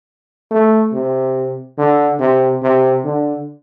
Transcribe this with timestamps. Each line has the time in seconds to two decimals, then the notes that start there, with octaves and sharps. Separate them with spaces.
0.51 A3
0.93 C3
1.78 D3
2.20 C3
2.62 C3
3.04 D3